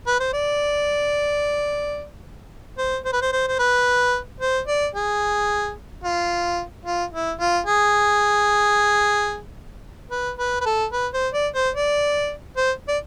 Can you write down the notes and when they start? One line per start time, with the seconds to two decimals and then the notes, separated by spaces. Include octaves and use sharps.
0.07 B4
0.20 C5
0.33 D5
2.78 C5
3.05 C5
3.13 B4
3.22 C5
3.32 C5
3.48 C5
3.59 B4
4.40 C5
4.68 D5
4.95 G#4
6.04 F4
6.86 F4
7.13 E4
7.40 F4
7.66 G#4
10.11 B4
10.39 B4
10.61 B4
10.66 A4
10.93 B4
11.14 C5
11.33 D5
11.55 C5
11.75 D5
12.57 C5
12.88 D5